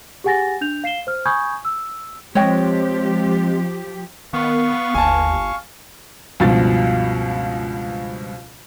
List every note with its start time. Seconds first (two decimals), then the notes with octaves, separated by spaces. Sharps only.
0.24 G4 G#4 F#5 G#5 A6 A#6
0.61 D4 G6 F7
0.84 F5 C7 E7 G7
1.07 C5 F6
1.25 G#5 B5 C#6 D#6 G6 G#6
1.65 E6
2.35 F3 G#3 C4 G4 C#5 D#5 G5
4.33 D#3 B3 F5 C#6
4.94 G1 D#2 G#5 A5
6.40 C#2 G2 B2 F3 A6